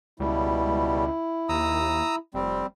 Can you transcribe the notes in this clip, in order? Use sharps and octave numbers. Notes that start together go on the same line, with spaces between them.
C#2 B2 G3 E4
D#2 A#5 D#6 E6
F1 G3 C4